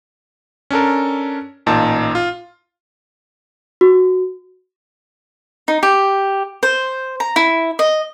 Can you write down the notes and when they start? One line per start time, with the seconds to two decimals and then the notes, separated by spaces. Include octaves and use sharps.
0.71 C#4 D4 A4 A#4
1.66 A1 A#2 D#4 A5 A#5
2.15 F4
3.81 F#4
5.68 D#4
5.83 G4
6.63 C5
7.20 A#5
7.36 E4
7.79 D#5